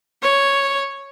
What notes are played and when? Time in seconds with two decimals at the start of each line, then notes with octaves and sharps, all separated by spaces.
0.22 C#5